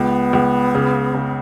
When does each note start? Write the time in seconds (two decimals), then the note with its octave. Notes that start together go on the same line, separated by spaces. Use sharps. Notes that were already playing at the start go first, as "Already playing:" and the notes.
Already playing: C#2 B3
0.33 C#2
0.75 C#3
1.14 C#3